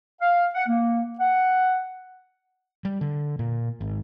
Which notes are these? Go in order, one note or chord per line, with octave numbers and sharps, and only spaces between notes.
F5
F#5
A#3
F#5
G3
D3
A#2
G#1